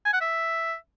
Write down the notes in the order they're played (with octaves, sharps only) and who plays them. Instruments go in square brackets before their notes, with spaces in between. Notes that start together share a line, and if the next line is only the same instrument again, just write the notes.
[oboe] G#5
F#5
E5